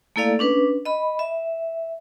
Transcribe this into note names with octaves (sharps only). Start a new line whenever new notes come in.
A3 A#3 E4 A4 D5 F5
C#4 D4 B4
D#5 B5
E5